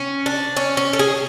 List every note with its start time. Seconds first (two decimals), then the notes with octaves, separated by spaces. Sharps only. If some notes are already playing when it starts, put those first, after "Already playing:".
Already playing: C#4
0.26 D4
0.57 C#4
0.77 C#4
0.93 A4
0.99 G#4